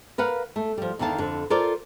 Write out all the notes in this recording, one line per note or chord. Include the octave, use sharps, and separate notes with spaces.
A#4 B4 F5 F#5
A3
F3 G3
E2 D3 D#3 F5 A5
F2 D3
F4 A4 A#4 C5 D5